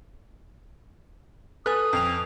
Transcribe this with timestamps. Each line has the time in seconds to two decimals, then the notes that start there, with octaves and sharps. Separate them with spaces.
1.66 A4 B4 G#5 D#6 F#6
1.93 F2 F6 C7 F7